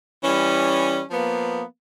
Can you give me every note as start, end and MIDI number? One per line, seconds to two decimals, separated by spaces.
0.24 1.01 52
0.24 1.01 55
0.24 1.01 61
1.11 1.62 53
1.11 1.62 58
1.11 1.62 59